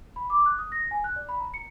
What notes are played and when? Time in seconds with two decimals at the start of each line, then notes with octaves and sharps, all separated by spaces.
0.16 B5
0.30 D6
0.46 F#6
0.58 D#6
0.72 A#6
0.91 G#5
1.04 F#6
1.16 D5
1.29 B5
1.41 A#5
1.54 C#7